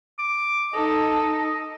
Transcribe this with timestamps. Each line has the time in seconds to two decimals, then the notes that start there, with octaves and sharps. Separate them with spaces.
0.19 D6
0.74 D#4 A4 D#5